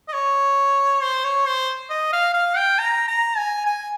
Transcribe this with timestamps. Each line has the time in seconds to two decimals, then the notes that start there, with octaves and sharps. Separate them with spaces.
0.08 D#5
0.13 C#5
1.02 C5
1.24 C#5
1.46 C5
1.90 D#5
2.13 F5
2.34 F5
2.57 G5
2.79 A#5
3.08 A#5
3.37 G#5
3.66 G#5